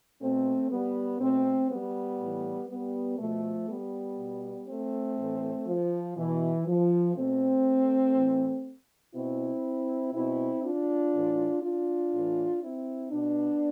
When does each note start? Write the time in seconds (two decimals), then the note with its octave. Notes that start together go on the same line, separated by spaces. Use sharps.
0.20 B2 A3 C4
0.70 G3 B3
1.20 B2 A3 C4
1.69 G3 B3
2.19 A2 E3
2.68 G3 B3
3.18 B2 F3 A3
3.68 G3 B3
4.18 B2
4.67 A3 C4
5.17 A2 E3
5.66 F3
6.16 B2 E3
6.66 F3
7.15 B2 A3 C4
8.14 A2 E3
9.13 B2 C4 E4
10.12 B2 C4 E4
10.62 D4 F4
11.12 A2 E3
11.61 D4 F4
12.11 A2 E3
12.61 C4 E4
13.11 B2 B3 D4